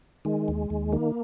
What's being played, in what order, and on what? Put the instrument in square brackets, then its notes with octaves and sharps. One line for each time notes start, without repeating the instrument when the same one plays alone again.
[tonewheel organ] D#3 G#3
D#2
D#2
D#3 A#3